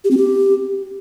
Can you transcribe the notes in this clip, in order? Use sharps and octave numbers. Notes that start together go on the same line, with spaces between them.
G4
C4
G4